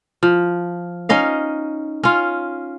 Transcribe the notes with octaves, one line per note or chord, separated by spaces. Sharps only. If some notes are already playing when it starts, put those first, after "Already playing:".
F3
C#4 D#4 D#5 F5
C#4 F4